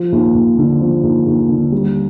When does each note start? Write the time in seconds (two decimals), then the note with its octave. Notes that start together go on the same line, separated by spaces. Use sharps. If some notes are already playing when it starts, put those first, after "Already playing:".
Already playing: F3
0.12 D#2
0.34 D#2
0.58 D3
0.81 F3
1.03 D#2
1.26 D#2
1.49 D3
1.72 G3